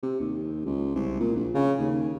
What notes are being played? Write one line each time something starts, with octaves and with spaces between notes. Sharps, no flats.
C3
D#2
C#2
C2
A#2
A#1
C#3
D#2